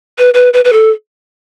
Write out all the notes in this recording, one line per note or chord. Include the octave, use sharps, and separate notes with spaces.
B4
B4
B4
B4
A4